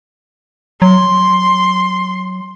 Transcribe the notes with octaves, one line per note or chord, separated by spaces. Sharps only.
F#3 C6